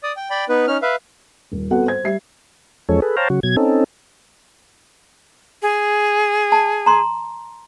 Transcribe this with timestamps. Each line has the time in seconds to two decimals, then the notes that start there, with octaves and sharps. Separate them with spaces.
0.03 D5 D#6
0.17 G5
0.30 D5 G5 B5
0.49 B3 D#4 B4
0.67 C#4 D#4 F6
0.82 B4 E5 F5
1.52 D#1
1.71 B3 C4 F#4 A4 F#5
1.86 C5 G#6
2.04 G3 E5 C7
2.89 E2 F3 G#3 C#4 A4 C#5
3.02 G#4 A4 B4
3.17 C5 C#5 F5 G5 A5 A#5
3.30 C#3 F#3 F#4
3.43 B2 F#3 G#6
3.57 C4 C#4 D#4 A4
5.62 G#4
6.52 A5
6.86 A#5 C6